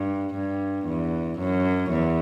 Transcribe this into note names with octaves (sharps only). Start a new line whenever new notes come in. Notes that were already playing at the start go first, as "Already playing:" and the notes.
Already playing: G2
G2
E2
F#2
E2